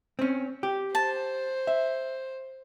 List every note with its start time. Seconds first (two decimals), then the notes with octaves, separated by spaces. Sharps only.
0.19 C4 C#4
0.63 G4
0.95 C5 A5
1.67 E5